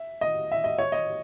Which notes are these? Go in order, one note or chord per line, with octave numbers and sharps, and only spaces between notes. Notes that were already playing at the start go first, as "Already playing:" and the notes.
Already playing: E5
D#5
E5
D#5
C#5
D#5